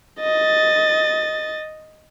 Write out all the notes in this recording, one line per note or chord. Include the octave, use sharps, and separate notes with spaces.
D#5 A6